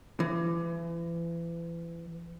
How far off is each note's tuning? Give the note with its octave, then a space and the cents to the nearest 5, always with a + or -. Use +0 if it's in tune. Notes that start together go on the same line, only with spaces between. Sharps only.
E3 +35